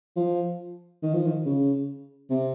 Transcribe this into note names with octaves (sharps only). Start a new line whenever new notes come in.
F3
D#3
F3
D#3
C#3
C3